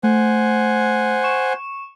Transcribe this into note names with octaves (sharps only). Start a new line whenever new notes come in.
A3 C5 F#5 G#5
C#6 E7